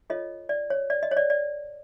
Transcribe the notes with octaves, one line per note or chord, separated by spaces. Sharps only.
F4 A4 C#5 D#5
D5
C#5
D5
D#5
C#5
D5
D5